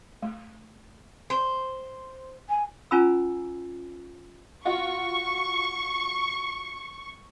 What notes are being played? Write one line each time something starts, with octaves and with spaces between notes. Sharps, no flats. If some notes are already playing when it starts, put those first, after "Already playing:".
A3
C5
G#5
C#4 F4 G#5 A#5 B5 E6
F4 F#4 C#6